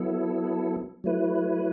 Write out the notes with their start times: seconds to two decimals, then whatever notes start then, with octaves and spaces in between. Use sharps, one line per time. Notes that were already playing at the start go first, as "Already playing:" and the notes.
Already playing: F#3 B3 E4 A4
1.04 F#3 A3 E4 B4